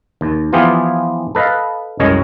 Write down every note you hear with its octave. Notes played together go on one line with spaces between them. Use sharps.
D#2
E3 F3 B3 F4 G4 G#4
A4 B4 D#5 F5
C2 F#2 G#3 C#5 D#5